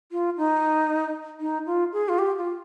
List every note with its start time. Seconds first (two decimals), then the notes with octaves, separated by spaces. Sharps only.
0.12 F4
0.37 D#4
1.40 D#4
1.66 F4
1.93 G#4
2.09 F4
2.18 G4
2.38 F4